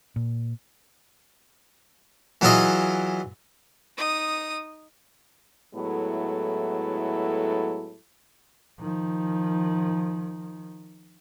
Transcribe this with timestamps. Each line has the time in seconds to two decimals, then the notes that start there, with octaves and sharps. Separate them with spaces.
0.16 A#2
2.41 E3 F#3 E4 F4 G#4 D#5
3.97 D#4 D#6
5.74 A2 F#3 G#3 B3 E4 A4
8.80 D#3 F3